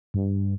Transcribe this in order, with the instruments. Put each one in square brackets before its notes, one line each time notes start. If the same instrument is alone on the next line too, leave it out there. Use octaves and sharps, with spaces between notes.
[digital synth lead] G2